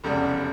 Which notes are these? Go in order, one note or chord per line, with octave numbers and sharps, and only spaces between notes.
F1 E2 C#3 G3